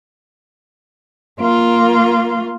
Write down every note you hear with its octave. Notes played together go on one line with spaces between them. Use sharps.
A#3 F4